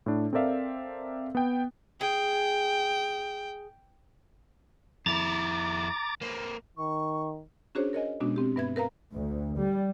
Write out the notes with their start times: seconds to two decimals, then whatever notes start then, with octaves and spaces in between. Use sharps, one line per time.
0.06 A2 D4
0.33 C4 A4 A#4 D5 E5 F5
1.35 B3 G5
2.01 G#4 G5
5.06 F2 E4 A#5 D6 A6
6.22 A#3 C4
6.77 D#3 C#6
7.75 C#4 D4 F#4 G#4 C5 C#5
7.93 A#4 C#5 D#5 G#5
8.20 B2 G#3 B3 C#4 D4 F#4
8.36 C4 G4
8.56 G2 B3 B4 E5 B5 G#6
8.76 A#4 B4 F5 A#5
9.13 D2
9.59 G3